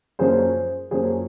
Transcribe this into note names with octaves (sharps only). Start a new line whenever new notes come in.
F#2 F3 A#3 C#4 G#4 C5
F#2 F3 A#3 C#4 G#4 C5